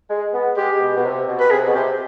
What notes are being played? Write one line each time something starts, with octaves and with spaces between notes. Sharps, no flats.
G#3
B3
G#3 G4
B2
B2
C3
B2
B4
C3 G#4
B2
C3 G4